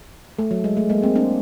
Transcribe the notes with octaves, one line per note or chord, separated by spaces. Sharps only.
A3
F#3
G#3
A3
G#3 A#3
A#3 C4
C4 D4